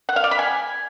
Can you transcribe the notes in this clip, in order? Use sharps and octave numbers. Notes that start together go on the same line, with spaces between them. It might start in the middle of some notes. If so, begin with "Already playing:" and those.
F#5
F5
D5
B5
G#5